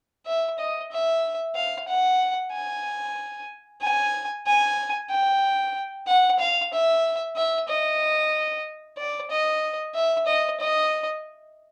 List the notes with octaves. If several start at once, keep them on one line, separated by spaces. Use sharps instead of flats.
E5
D#5
E5
F5
F#5
G#5
G#5
G#5
G5
F#5
F5
E5
E5
D#5
D5
D#5
E5
D#5
D#5